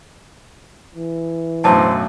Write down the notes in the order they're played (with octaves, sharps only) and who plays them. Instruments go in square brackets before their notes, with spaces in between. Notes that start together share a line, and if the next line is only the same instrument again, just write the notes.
[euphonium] E3
[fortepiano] B1 F#2 A2 [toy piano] D4 A5 [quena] C5